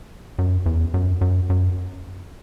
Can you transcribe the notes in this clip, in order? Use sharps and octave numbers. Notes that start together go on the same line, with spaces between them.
F#2
E2
F#2
F#2
F#2